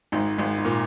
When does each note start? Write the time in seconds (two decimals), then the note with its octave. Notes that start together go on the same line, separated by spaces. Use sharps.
0.12 G#1 G#2
0.38 G#1 G#2
0.58 G#2
0.65 A#2